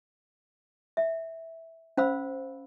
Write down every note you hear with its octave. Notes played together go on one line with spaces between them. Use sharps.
E5
C#4 C5 F5 B5 E6